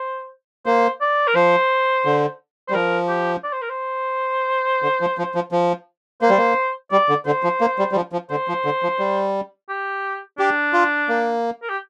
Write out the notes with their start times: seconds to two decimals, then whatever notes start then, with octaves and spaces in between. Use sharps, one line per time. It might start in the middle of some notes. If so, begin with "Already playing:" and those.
Already playing: C5
0.66 A#3 C5
1.01 D5
1.28 A#4
1.35 F3 C5
2.05 D3
2.68 G3 C5
2.74 F3 A#4
3.08 G4
3.44 D5
3.53 C5
3.62 A#4
3.69 C5
4.83 D3
5.00 F3
5.18 F3
5.35 F3
5.52 F3
6.22 A#3 C5
6.30 G3
6.38 A#3
6.91 G3 D5
7.09 D3
7.25 D3 C5
7.43 F3
7.61 A#3
7.79 G3
7.92 G3
7.96 F3
8.12 F3
8.30 D3 C5
8.48 F3
8.65 D3
8.83 F3
8.99 G3
9.69 G4
10.39 D4 G4
10.73 F4
11.09 A#3
11.62 A#4
11.69 G4